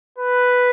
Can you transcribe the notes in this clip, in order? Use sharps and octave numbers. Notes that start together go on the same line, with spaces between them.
B4